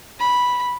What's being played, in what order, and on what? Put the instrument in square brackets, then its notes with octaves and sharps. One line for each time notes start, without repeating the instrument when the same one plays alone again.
[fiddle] B5